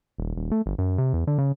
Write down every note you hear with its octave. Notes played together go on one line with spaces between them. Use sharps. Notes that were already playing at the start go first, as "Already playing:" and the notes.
D#1
D#1
A3
G1
F#2
C3
E2
D3
C#3